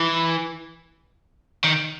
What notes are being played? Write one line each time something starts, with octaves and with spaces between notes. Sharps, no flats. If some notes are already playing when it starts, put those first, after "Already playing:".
Already playing: E3
D#3